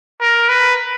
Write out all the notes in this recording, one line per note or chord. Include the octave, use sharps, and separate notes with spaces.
A#4
B4